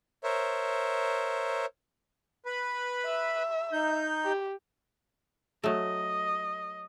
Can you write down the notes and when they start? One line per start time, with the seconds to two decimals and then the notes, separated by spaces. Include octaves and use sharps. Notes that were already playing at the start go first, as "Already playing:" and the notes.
0.24 A#4 C5 C#5 E5
2.46 B4 B5
3.05 E5
3.73 D#4 G6
4.24 G4
5.64 F#3 A3 D#5